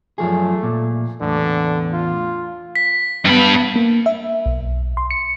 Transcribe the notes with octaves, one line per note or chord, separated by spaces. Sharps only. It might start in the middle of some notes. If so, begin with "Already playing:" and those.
F#2 F3 A3 G#4
A#2
E2 A2 D3
F4
B6
G2 B3 B5
A#3
E5
B1
C6
C#7